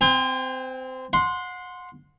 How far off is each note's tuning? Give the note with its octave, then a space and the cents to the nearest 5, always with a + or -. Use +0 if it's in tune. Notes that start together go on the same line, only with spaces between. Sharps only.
C4 -20 G5 +45
F#5 -30 C6 +0